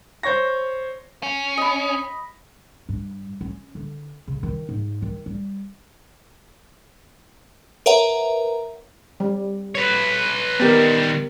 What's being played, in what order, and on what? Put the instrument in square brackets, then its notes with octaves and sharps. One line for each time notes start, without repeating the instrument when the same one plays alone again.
[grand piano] C5 C#5 C#6 A#6
[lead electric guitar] C#4
[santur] D#5 B5
[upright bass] G2
C#4
D3
C#3
D#3
G#2
D#3
G3
[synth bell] A#4 B4 C#5 E5 F#5 A#5
[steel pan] G3
[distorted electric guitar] B4 C#5
[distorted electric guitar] D#3 G3 [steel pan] B3 G4 A#4